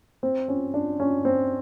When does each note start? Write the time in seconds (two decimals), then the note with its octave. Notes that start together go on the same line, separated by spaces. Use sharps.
0.23 C4
0.48 C#4
0.74 D4
1.00 C#4
1.25 C4